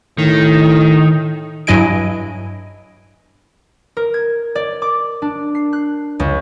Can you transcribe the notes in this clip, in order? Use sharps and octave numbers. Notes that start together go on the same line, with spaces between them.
A2 D#3
G2 F#3 E4 D#5 G#5 D7
A#4
G#6
D5
D6
D4
C7
F#6
C#2